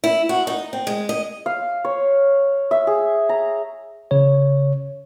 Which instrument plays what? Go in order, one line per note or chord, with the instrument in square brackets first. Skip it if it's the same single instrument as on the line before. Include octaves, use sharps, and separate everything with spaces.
[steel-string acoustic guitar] E4
F#4
D#4
C4
G#3
D#5
[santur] F5
C#5
E5
G#4
A#5
[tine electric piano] C#3 C#5